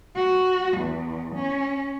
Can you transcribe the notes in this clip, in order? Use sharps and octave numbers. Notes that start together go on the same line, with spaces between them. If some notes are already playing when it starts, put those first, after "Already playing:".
F#4
E2
C#4